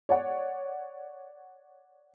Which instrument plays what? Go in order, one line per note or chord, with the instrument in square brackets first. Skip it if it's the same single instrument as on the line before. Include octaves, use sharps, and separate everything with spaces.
[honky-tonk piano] C#5 D5 F#5